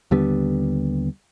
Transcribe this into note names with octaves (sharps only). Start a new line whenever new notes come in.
D#2 D3 G3 B3